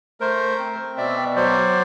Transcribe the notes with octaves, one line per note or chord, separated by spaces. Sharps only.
A3 A#4 C5
C4
B2 D5 E5
F#3 C5 D5